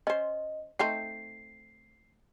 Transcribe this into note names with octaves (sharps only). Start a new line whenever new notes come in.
C#4 C5 D#5
A3 C4 D#4 C7